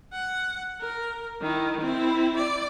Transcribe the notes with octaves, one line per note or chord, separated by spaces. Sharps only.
F#5
A#4
D#3 E4
C4 E4
D5